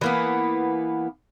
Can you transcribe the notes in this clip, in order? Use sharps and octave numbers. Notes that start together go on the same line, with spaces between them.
E3 A#3 B3